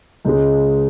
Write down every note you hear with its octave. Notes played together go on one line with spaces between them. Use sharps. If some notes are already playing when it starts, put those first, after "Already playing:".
C#2 C#3 G#3